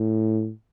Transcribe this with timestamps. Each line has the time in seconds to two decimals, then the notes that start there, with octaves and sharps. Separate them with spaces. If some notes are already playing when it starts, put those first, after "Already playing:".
Already playing: A2